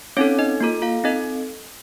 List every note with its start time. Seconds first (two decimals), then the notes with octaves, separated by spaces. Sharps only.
0.17 C4 C#4 D#4 A4 C#5
0.39 D#4 D#5
0.60 A#3 F4 A4
0.82 F4 F5
1.04 C4 D#4 A4 D#5